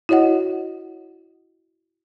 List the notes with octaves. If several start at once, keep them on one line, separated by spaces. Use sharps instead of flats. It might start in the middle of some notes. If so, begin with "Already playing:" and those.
E4 F#4 C#5 D#5 F#5